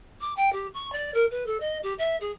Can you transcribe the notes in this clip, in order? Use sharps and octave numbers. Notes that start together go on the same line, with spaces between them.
D6
G5
G4
C#6
D5
A#4
B4
A4
D#5
G4
E5
G#4